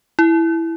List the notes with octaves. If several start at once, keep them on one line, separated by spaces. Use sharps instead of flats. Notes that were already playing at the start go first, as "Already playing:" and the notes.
E4